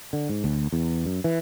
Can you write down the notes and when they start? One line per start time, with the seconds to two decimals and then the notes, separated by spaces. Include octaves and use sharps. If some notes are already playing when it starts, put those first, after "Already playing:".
0.13 D3
0.29 G#2
0.44 D2
0.72 E2
1.05 F#2
1.24 E3